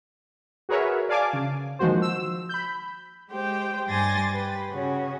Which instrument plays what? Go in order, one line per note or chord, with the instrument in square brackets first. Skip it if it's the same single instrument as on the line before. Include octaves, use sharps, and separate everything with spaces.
[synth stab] F#4 G#4 A#4 B4 C#5 E5
D5 F5 G#5 A5 D6
C#3
D#3 F3 G#3 A#3 F#4 C5
E6
B5 G6
[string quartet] G#3 G4 C5 G5
G2 G#5 C6 D6 A6 A#6
G4 B4
C#3 C#4 F#4